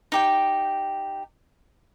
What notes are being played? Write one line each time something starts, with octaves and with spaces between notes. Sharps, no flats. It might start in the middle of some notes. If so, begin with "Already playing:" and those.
D#4 G4 G5